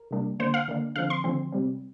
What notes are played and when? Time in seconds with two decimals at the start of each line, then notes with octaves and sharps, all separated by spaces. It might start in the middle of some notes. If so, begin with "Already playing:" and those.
Already playing: A#4
0.11 C3 G3 A#3 D4
0.40 D3 A#3 D4 C5
0.54 F5
0.68 D3 A#3 D4
0.96 D3 F3 C4 F5
1.10 C6
1.24 D3 F3 C4
1.52 C3 G3 C4